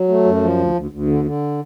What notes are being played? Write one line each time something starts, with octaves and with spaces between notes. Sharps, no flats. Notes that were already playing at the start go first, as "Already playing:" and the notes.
Already playing: F#3
A3
F#2
F3
D2
D2
D2
D3
D3